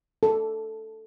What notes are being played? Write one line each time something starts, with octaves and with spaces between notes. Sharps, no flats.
A4